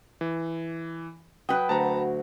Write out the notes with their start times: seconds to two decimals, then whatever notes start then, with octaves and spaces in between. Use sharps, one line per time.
0.21 E3
1.49 F#3 B4 G5 D#6
1.69 D2 F#4 A5 A#5 C#6